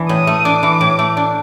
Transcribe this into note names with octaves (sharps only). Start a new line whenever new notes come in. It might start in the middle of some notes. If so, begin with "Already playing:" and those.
Already playing: E3 D4
A2 D#6
A3
D4 D6
E3
A2
A3
D4